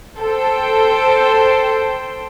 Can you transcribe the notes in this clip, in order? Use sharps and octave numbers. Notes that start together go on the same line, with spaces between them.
A4 C5 G5